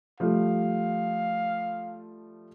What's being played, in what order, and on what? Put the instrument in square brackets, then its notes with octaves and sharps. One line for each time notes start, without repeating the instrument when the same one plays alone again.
[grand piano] F3 G3 A3 [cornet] F5